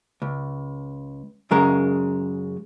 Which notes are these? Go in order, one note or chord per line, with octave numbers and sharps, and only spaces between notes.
C#2
F#2 C#3 G#3 A#4